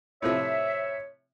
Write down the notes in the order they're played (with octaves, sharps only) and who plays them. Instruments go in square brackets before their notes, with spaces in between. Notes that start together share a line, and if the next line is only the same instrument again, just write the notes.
[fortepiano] A2 C3 F3 [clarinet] C#5 [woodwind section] E5